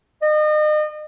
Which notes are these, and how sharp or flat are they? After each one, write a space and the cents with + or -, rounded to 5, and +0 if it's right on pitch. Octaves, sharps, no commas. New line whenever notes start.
D#5 -35